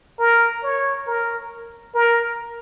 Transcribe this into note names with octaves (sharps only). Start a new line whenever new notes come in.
A#4
C#5
A#4
A#4